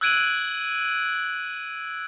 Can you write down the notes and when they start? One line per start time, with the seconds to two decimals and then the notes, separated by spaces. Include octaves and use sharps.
0.01 E6 F#6 G#6 D7 D#7 F#7